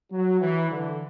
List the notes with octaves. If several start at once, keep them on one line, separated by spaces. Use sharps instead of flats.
F#3
E3
D3